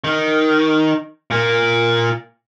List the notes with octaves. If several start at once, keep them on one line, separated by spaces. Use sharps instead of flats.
D#3
A#2 A#3